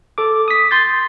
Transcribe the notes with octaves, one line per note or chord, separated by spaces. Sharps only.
A4 D6
D#6 B6
C6 G6 A6